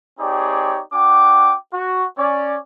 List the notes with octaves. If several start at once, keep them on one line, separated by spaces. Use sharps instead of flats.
C4 D#4 G4 G#4 C#5 D5
D4 F#4 G5 D6
F#4
C#4 D5